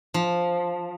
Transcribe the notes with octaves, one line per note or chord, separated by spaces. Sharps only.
F3